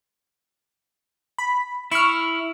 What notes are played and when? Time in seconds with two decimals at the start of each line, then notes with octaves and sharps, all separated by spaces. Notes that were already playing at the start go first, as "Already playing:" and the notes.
1.38 B5
1.92 E4 C#6 F6